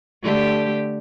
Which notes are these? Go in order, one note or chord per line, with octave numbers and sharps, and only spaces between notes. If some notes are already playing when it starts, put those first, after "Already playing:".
D3 A3 G4